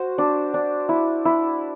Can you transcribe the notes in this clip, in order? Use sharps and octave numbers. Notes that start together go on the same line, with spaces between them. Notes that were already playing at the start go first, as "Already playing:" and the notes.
Already playing: F#4 C5
D4
D4
E4
E4